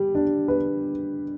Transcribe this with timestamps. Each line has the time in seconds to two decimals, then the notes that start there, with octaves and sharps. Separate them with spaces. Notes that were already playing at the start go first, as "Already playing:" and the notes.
Already playing: G3 G4
0.15 D4
0.48 B4